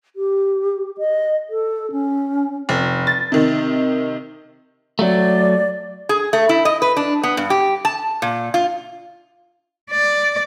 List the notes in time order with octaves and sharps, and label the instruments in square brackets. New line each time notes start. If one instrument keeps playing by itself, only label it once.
[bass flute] G4
D#5
A4
C#4
[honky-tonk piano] F1
A6
C3 D#3
[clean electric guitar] F#3 A3 [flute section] D5
[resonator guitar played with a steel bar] G#4
A3
E4
D#5
B4
D4
B3
G2
G4
A5
A#2
F4
[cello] D5